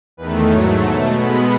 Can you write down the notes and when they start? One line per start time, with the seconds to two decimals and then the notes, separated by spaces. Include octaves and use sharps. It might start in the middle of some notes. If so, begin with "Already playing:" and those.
0.17 E2 D#3 A3 B4
0.50 G#2 F#3 A3 C#5
0.82 B2 A3 A5
1.14 B2 G#3 B3 B5